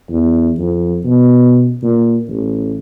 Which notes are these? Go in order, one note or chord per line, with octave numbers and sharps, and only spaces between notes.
E2
F2
B2
A#2
A1